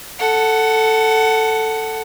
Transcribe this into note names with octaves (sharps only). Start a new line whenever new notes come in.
A4 F#5